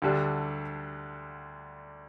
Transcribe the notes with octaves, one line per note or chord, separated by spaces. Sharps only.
D2 D3 G3 D4